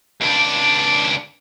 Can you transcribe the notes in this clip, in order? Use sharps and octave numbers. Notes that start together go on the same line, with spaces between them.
C#2 D4